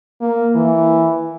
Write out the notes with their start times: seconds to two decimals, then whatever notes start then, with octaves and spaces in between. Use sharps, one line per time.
0.21 A#3
0.55 E3